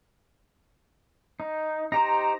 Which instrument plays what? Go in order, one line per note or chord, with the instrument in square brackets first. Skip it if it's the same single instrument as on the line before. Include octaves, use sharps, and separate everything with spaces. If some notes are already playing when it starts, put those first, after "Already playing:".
[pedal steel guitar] D#4
[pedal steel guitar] D#4 G4 C5 [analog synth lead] A#5